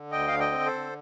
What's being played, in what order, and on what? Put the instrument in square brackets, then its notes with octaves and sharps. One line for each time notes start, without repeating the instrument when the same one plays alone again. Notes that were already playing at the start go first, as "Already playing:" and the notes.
Already playing: [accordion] D3
D2 D#5 G5
D3 F5
D#5 G5
C4
A4 C5
D3